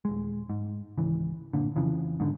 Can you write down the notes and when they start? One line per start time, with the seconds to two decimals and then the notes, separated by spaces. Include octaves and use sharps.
0.05 D#1 G#3
0.50 G#2
0.98 G#1 C#2 E3
1.53 G1 A#2 D3
1.76 F2 C#3 E3 F3
2.20 G#2 D3